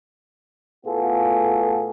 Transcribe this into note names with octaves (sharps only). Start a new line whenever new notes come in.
A2 B3 F4 F#4 G#4 A4